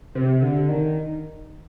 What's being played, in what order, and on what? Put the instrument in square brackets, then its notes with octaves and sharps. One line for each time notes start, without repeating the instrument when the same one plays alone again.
[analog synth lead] C3
D3
D#3